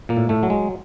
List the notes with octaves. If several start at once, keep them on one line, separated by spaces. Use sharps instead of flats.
A#2 A#3
A2
A2 A3
F#3
G#3